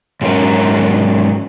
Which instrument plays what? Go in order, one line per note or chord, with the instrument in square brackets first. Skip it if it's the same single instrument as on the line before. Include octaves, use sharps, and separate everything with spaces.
[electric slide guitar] G#2 F#3 C#4 A#4